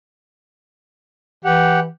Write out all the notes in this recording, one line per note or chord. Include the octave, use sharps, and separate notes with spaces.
E3 G4 F#5